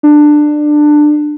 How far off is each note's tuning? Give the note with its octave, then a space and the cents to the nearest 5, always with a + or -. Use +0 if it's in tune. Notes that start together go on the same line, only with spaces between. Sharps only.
D4 +15